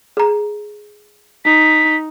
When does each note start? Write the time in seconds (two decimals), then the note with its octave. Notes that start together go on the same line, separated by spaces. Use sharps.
0.17 G#4 A#5
1.45 D#4 B6